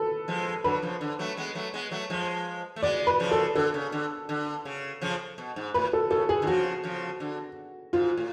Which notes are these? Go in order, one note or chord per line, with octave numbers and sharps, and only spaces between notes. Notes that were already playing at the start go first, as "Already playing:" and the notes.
Already playing: A4 B4
F3 G#3
D3 F#3 B4
C#3 F3
D3
F#3 A3
G#3 B3
F#3 A3
G#3 B3
F#3 A3
F3 G#3
A3
G#3 B3 D5
B4
C#3 F3
A4
D3 A4
C#3
D3
D3
C#3
C#3 F3
B2
G#2
A2 B4
A4
C#3 A4
G#4
D3
C#3 F3 F#4
C#3 F3
D3
G#2 F4
A2